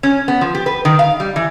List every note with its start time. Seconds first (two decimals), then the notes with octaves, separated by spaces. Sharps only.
0.03 C#4
0.28 B3
0.41 F3
0.55 G4
0.66 B4
0.85 D#3
0.99 F5
1.20 G3
1.36 E3